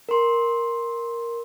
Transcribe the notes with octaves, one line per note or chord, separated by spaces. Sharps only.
A#4 C6